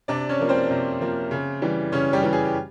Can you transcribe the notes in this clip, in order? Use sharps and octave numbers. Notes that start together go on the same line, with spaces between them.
C3 D4 D5
C#4 C#5
F3 A#3
C4 C5
C3
F3 A#3
C#3
E3 G3
C#3 C#4 C#5
G3 G4
E3 G3
G#4
G4